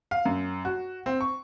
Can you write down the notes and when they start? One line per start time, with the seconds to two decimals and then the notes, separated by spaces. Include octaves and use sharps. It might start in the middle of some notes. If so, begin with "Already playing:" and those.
0.11 F5
0.25 F#2
0.65 F#4
1.06 C4
1.21 C#6